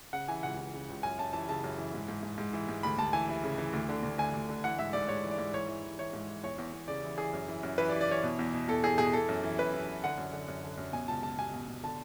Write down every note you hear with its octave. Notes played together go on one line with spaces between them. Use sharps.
C#3 F#5
E3 G#5
C#2 F#5
E3
C#3
C#2
F#2 G#5
F#2 A5
E3 A5
C#3 A5
F#2
E3
G#2
G#2
G#2
G#2
E3
G#2
D2 B5
D2 A5
E3 G#5
E3
C#3
E3
D2
D3
D2
D2 G#5
D2
D3
E3 F#5
G#2 E5
G#2 D5
G#2 C#5
E3
D5
G#2
E3 C#5
E3
E3
E3 C#5
G#2
E3
E2 C#5
E2
E2
C#3 D5
E3
E3 G#4
F#2
E3
F#2
E3 B4
D5
E3
D5
E3 C#5
B2
E2
B2
E2 A4
E2 G#4
B2 G#4
E3 A4
F#2
E3
F#2 B4
E3
E3
D3 F#5
F#2
D3
F#2
D3
F#2
B2 G#5
C#2 A5
C#2 A5
B2 G#5
B2
B2
D3 A5